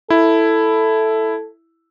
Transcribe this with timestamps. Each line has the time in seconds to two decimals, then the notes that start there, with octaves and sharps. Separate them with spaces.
0.10 E4 A4